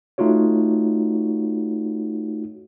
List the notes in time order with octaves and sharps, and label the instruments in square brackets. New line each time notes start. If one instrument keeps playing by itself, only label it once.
[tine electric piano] A3 D#4 F4 F#4 C#5